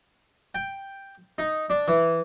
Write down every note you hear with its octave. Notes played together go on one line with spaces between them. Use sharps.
G5
D#4
D4
E3